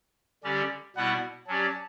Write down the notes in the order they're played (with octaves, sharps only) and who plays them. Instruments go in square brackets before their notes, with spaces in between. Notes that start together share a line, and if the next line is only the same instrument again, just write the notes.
[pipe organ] D3 G3 C#4 G4 D5
[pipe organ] B2 G3 B3 E4 [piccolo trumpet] F#5
[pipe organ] F#3 C#4 G4 D5 [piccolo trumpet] A5